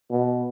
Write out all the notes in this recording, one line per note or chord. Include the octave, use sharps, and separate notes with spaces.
B2